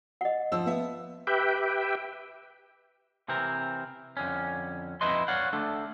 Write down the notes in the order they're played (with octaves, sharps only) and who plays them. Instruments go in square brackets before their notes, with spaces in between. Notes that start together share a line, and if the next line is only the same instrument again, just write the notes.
[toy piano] D#5 F#5
[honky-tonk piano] F3 E6
B3 E5
[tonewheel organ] G4 B4 E5 G5
[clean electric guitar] C3 E3 C4 A#4
F2 D3 C#4
F2 D#4 E4 B4 D#5 C6
C#5 D5 F5 F#5
A3 D4 A4